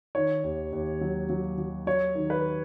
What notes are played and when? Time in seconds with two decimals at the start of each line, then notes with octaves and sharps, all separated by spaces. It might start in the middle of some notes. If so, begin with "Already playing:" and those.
0.15 D#3 C#5
0.44 D#2
0.73 D#2
1.01 F#3
1.30 F#3
1.58 F#3
1.87 F#3 C#5
2.15 D#3
2.30 B4